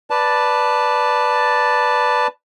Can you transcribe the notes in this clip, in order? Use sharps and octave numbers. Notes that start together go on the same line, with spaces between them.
B4 D5 A5